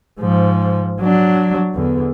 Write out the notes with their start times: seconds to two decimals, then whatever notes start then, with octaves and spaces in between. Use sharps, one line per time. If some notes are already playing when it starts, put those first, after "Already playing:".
0.20 G#2 F3
1.00 F#3 D4
1.74 E2 D3